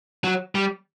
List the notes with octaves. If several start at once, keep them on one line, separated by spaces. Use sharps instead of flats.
F#3
G3